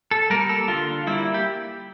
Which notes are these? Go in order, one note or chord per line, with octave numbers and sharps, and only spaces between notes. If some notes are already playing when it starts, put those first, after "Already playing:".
A4
G3 A#3 A#4
A4
D3 F4
G3 A#3 E4
G4